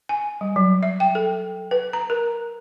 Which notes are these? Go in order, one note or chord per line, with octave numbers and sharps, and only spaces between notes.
G#5
G3
F#3
E5
G5
A4
B4
A#5
A#4